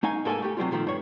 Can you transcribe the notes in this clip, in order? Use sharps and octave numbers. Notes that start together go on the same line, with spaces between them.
A3 D#4 F5 G#5
G#2 A#3 A4 C5 E5 G#5
A3 G4
C3 F#3 G3 F4
A#2 D#3 F3 A3
G2 C#5